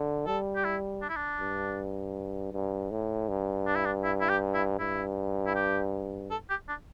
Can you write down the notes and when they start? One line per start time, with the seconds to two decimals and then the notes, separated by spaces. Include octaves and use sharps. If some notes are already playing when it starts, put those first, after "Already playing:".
Already playing: D3
0.26 G3 A4
0.56 G4
0.64 E4
1.02 D4
1.09 E4
1.16 D4
1.40 G2
2.53 G2
2.91 A2
3.29 G2
3.67 D4
3.75 E4
3.85 D4
4.04 E4
4.21 E4
4.29 G4
4.54 E4
4.79 G2 E4
5.47 E4
5.55 G4
6.31 A4
6.50 G4
6.68 D4